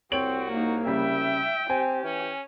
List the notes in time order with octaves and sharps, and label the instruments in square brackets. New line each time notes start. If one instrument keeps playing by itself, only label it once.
[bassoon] C2 [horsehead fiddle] C4 [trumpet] F#4 [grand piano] C#5 D7 F#7
[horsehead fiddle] A#3 D#4
[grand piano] C#3 G3 [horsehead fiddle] E5 [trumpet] G5
[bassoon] C4 [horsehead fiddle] G4 [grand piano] G#5
[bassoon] E3 [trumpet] C#4